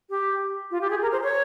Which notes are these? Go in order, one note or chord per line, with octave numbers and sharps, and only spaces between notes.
G4
F4
G4
G#4
A#4
C5
C#5